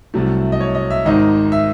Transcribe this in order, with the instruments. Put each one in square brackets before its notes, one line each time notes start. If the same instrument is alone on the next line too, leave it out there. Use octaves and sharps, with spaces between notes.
[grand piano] C2 C3 F#3 A3
D#5
C#5
D#5
E5
G#1 G#2 D#3 D#5
E5